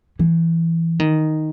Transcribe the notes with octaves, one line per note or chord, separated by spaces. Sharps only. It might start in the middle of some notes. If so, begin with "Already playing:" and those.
E3
D#3